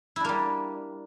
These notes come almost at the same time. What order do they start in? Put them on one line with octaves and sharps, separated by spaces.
E4 D4 A#3 G3